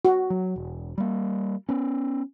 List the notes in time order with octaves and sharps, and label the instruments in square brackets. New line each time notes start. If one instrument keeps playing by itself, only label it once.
[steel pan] F#4
[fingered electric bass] F#3
E1
G3 A#3
B3 C#4